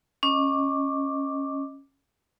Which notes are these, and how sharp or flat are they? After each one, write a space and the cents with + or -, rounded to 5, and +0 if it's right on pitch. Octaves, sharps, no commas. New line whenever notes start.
C#4 -15 D#5 +0 D6 +0